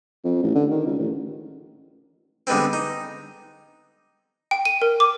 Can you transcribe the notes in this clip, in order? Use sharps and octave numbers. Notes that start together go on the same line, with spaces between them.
F2
A1
D3
D#3
C#2
A1
D3 G3 G#3 B3 C4
D#4
G5
D#7
A#4
D6